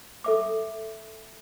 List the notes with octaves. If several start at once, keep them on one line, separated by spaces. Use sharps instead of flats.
A4 E5 D6